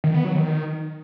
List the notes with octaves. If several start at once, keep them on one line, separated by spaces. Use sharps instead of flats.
D#3
B3
F#3
D#3